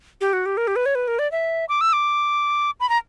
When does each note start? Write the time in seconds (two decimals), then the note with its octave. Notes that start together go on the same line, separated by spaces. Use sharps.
0.21 G4
0.33 F#4
0.46 G4
0.57 A#4
0.67 G4
0.76 B4
0.86 C#5
0.95 B4
1.08 A#4
1.19 D5
1.32 E5
1.69 D6
1.81 E6
1.93 D6
2.80 B5
2.89 A#5